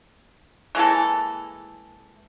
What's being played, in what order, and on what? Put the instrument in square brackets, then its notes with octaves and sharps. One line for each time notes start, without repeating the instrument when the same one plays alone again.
[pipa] E3 G#3 A#3 A4